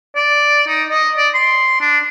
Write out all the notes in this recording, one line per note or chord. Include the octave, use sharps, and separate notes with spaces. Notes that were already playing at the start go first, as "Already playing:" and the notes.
D5
D#4
D#5
D5
C6
D4